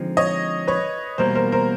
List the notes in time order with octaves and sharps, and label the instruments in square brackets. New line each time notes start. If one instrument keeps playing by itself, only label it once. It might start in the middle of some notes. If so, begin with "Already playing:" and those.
Already playing: [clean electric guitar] D3 F3 G#3 C4 D#4
[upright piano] C#5 D#5
B4 C#5
[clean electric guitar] E2 B2 G3 A#3 [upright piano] A#4 C5
[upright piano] A#4 C5
A#4 C5